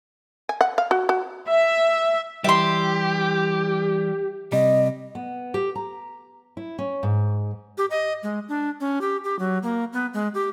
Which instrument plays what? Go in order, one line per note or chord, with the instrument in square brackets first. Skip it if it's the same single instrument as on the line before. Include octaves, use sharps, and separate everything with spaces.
[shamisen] G#5
F#5
F5
F#4
F#4
[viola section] E5
[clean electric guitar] E3 G3 [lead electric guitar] G4 [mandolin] E5 C6
[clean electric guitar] C3 G3 [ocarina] D#5
[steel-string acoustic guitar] B3
G4
A#5
E4
C#4
G#2
[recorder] G4
D#5
G#3
D4
C#4
G4
G4
F#3
A#3
B3
G#3
G4